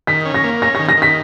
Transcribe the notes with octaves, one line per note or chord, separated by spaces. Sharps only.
D#3 B6
C#4
A#6
A#3
C#4 A#6
A#6
D#3
A#6
D#3
B6